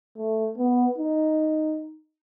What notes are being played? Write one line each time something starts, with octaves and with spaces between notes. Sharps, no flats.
A3
B3
D#4